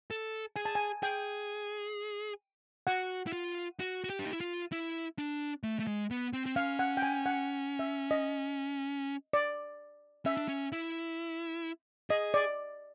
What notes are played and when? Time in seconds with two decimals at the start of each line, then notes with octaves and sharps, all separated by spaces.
0.11 A4
0.56 G#4 G#5
0.65 A5
0.75 G#5
1.03 G#4 G5
2.87 F#4 F#5
3.27 E4
3.33 F4
3.80 F#4
4.04 F#4
4.10 G4
4.19 D4
4.26 D#4
4.33 E4
4.41 F4
4.72 E4
5.18 D4
5.63 A3
5.80 A3
5.87 G#3
6.11 B3
6.33 C4
6.46 C4
6.56 C#4 F5
6.79 F#5
6.97 G5
7.03 G#5
7.26 F#5
7.79 E5
8.11 D#5
9.33 D5
10.26 C#4 E5
10.37 D4
10.48 C#4
10.72 E4
12.10 G#4 D#5
12.34 D5